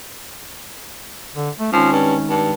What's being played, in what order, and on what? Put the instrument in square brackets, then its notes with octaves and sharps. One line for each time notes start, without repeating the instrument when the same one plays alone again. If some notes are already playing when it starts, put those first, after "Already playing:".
[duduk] D3
A3
[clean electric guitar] G#2 D#3 [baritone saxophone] F3 [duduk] C#4
[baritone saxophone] G2
G2